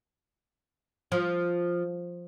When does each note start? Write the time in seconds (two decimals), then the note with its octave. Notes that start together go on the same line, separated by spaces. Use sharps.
1.12 F3